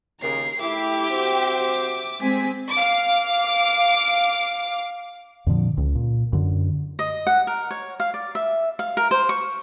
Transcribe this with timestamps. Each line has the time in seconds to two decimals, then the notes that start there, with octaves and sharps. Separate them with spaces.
0.20 D#2 C#3 A#4 C7
0.61 A3 E4 G4 E5 D6
1.09 C4 F#4 C5
2.22 G#3 C4 G#5 B6
2.70 F5 D6
5.47 F2 A#2 D3 F3
5.77 C#2
5.95 A#2
6.33 F#2 D3
6.99 D#5
7.27 F#5
7.47 A#4
7.71 C#5
8.00 F5
8.14 D5
8.35 E5
8.79 F5
8.97 A#4
9.11 C5
9.29 C#6